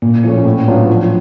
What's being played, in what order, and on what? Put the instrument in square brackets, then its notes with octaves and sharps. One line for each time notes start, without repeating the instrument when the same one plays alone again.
[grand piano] A#2 [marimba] A#3
[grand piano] F3 A3 C#4 [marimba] A#3
[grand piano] A2
F#3 B3 D4 F4
F3